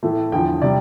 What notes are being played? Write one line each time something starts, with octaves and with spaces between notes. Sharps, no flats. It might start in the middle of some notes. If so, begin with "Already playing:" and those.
A2 E3 A3
E2 D3 F3 G5
C3 G3 D5